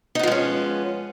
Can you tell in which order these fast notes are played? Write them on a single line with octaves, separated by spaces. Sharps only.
D#4 B3 F3 G#3 C#4